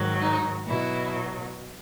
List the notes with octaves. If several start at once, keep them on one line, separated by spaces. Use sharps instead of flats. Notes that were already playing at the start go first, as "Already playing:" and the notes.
Already playing: G#2 D#3 F#3
D#4
B2 F#3 E4